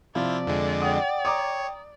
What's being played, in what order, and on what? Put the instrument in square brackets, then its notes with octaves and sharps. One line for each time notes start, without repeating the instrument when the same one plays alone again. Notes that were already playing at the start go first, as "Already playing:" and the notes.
[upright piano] C3 F3 [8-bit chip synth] E4 F4 [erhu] D5
[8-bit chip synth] F2 D3 G#3
[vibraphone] F#5 G5 [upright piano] D#6
[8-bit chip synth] C#5 [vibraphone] G5 [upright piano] A#5 D6 D#6